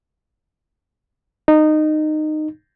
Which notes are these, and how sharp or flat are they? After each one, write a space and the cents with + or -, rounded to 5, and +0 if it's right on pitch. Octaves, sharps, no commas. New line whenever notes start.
D#4 -20